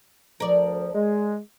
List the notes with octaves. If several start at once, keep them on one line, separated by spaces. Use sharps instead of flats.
D2 F3 A#4 D5
G#3